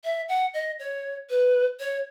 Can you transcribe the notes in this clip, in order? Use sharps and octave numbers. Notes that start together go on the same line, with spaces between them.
E5
F#5
D#5
C#5
B4
C#5